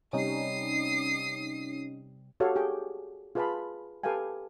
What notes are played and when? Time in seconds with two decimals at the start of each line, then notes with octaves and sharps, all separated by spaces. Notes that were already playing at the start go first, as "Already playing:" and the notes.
0.13 C3 G3 C4 C#4 D#4 D#6 C7
2.40 F#4 G4 A4 C#5 F5
2.55 G4 G#4 G5
3.35 F4 G#4 B4 F5 A5 B5
4.03 G4 A4 B4 F5 G5 G#5